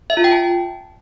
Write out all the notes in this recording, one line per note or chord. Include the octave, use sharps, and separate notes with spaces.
E5
F4
G5
A5